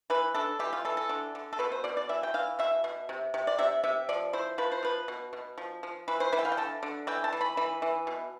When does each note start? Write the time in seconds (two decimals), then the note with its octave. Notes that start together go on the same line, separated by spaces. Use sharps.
0.10 E3 B4
0.34 D4 A4
0.59 E3 G4
0.73 F4
0.85 E3 A4
0.97 A4
1.09 D3
1.35 D3
1.53 A4
1.59 B2 B4
1.72 C5
1.84 B2 D5
1.97 D5
2.09 E3 E5
2.23 G5
2.34 E3 F5
2.59 B2 E5
2.84 B2
3.09 C3
3.34 C3
3.47 D5
3.59 C3 E5
3.84 C3 E5
4.09 F3 D5
4.33 E4 C5
4.58 F3 B4
4.72 C5
4.83 F3 B4
5.08 B2
5.33 B2
5.58 F3
5.83 F3
6.08 E3 B4
6.20 C5
6.32 E3 B4
6.39 G5
6.45 F5
6.52 G5
6.57 D3 A5
6.83 D3
7.07 E3 G5
7.24 A5
7.33 E3
7.41 B5
7.57 E3 B5
7.82 E3
8.07 B2